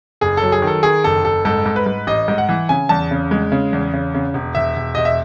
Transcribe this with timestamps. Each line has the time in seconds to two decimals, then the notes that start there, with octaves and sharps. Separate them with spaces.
0.21 F#1 G#4
0.37 F#3 A4
0.52 G#4
0.62 D#3
0.67 A4
0.83 D#3 G#4
1.04 F#1 A4
1.24 F#1 A4
1.45 G#2 A4
1.66 G#2
1.76 B4
1.86 G#2
2.07 A1 D#5
2.28 G#2
2.38 F#5
2.49 E3
2.69 C#3 G#5
2.89 E2 A5
3.11 C#3
3.31 G#3
3.52 C#3
3.73 E2
3.93 C#3
4.14 C#3
4.34 E1
4.55 E1 E5
4.76 E1
4.95 E1 D#5
5.05 E5